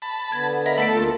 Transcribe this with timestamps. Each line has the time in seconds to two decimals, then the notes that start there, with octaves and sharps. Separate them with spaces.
0.02 A5 B5
0.32 D3 B3 G#6
0.66 A#4 D#5 E5 B5
0.78 A3 A4 B5 B6 D7
0.93 D2 A#3 F4